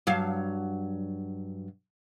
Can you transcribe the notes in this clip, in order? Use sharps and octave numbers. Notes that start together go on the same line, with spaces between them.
G2 F#3 F5